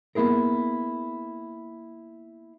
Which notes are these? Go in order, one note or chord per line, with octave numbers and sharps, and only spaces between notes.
A#3 B3 E4 G#4 A#4